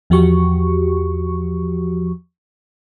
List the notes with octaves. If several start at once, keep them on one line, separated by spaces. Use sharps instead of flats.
E2 F3 F#4 G4 C#6